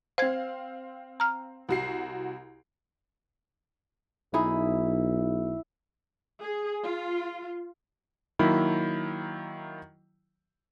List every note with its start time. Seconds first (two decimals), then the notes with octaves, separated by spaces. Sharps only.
0.18 C4 C5 F5 G#6
1.20 A#5 F6
1.69 C2 F#4 C7
4.34 B1 D#4 E4 G#4 B5
6.41 G#4
6.83 F4
8.39 D#3 F#3 A#3 E4 B5